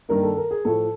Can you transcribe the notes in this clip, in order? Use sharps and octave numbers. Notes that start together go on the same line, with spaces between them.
G2 D#3 G3 A#3 A#4
A4
A#4
G#4
A2 F3 A3 A4